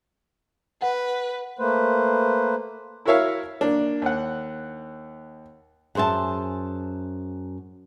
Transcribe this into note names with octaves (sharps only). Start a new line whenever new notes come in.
B4 F#5
A3 A#3 B4 C5
E4 F#4 A#4 C#5 E5 F5
A#3 D4
D#2 F#5
F#2 G#4 C5 E5 A5